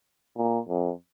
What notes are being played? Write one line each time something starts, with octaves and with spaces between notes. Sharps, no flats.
A#2
F2